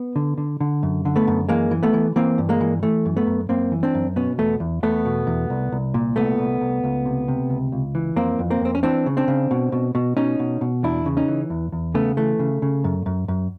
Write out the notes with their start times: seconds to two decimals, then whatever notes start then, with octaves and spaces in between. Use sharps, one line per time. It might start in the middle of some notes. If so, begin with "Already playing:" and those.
Already playing: B3
0.16 D3
0.38 D3
0.61 D3
0.83 F#2
1.05 D3
1.16 A3 B3
1.28 F#2
1.49 E3 G#3 A#3
1.71 E3
1.83 A3 B3
1.93 E3
2.16 E3 A#3 C4
2.38 G2
2.49 G#3 A#3
2.61 E3
2.83 E3 A3
3.06 F#2
3.17 A3 B3
3.27 F#2
3.49 F#2 A#3 C4
3.72 E3
3.83 C4 D4
3.94 F#2
4.16 B2 B3 C#4
4.38 E2 A3 B3
4.60 E2
4.83 E2 A3 B3
5.05 B2
5.27 E2
5.50 C2
5.72 C2
5.94 A#2
6.16 C2 A3 B3
6.39 C2
6.61 C2
6.84 C#2
7.05 C3
7.28 C3
7.50 C#2
7.72 C#2
7.95 E3
8.16 F2 A#3 C4
8.39 F2
8.50 A#3 C4
8.61 F2 C4
8.75 C#4
8.83 E3 C4 D4
9.06 C#3
9.17 C4 D4
9.28 C#3
9.51 B2
9.72 B2
9.95 B2
10.17 B2 C#4 D#4
10.39 B2
10.61 B2
10.84 E2 D4 E4
11.06 C#3
11.17 C#4 D#4
11.28 E3
11.50 E2
11.72 E2
11.94 C#3 A3 B3
12.17 E3 A3
12.39 C#3
12.62 C#3
12.84 F#2
13.06 F#2
13.28 F#2